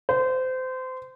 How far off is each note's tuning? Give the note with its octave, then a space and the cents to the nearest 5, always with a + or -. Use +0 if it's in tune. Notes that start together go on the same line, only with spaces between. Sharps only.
C5 -25